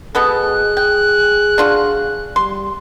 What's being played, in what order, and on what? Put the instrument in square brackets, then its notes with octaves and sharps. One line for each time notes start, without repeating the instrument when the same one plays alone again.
[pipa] B2 B3 A4 [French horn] G#4 [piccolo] F#6
[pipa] G5
D4 F4 F#4
[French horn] G3 [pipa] C6